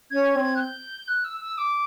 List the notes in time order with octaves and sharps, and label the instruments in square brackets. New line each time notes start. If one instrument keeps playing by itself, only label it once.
[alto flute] C#4 [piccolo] G#6
[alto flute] C4
[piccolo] F#6
G6
F#6
E6
E6
D6